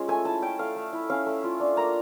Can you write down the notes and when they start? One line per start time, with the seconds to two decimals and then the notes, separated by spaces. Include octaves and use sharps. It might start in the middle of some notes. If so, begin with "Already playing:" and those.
Already playing: G#3 C#4 F4
0.08 A3 G#5
0.25 E4 A5
0.42 C#4 G5
0.59 A3 F5
0.76 A3
0.93 E4
1.10 C#4 F5
1.26 A3
1.44 F4
1.60 D4
1.77 A#3 A#5